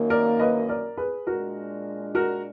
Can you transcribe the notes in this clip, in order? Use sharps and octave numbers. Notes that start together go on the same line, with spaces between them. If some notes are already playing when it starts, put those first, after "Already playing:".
Already playing: F#2 D#3 A#3
A#4 D5
B4 D#5
A#4 D5
G#4 B4
A#2 G#3 D4 F#4 A#4
F#4 A#4